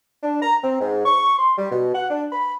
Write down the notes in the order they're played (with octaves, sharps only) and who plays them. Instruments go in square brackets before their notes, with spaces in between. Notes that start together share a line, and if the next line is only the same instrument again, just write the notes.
[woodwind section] D4
A#5
C4
G#2
C#6
C6
G3
B2
F#5
D4
B5